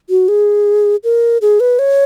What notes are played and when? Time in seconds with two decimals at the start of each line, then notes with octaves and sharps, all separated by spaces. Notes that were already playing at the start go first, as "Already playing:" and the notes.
0.10 F#4
0.28 G#4
1.04 A#4
1.42 G#4
1.60 B4
1.79 C#5